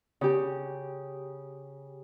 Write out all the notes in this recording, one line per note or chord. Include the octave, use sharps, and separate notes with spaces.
C#3 G4